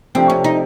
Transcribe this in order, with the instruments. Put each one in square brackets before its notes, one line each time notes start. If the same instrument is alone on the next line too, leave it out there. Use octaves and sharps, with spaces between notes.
[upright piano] C3 F3 A3 D4 G4 [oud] C4
[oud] C#4
D#4